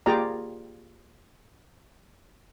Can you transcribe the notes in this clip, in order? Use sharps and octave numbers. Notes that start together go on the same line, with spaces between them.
A#3 F4 G4 G#4 D5 A#5